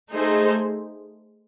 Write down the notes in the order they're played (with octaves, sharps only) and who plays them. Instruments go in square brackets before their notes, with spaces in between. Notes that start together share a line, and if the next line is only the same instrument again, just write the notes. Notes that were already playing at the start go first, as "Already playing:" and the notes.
[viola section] A3 D#4 G#4 C5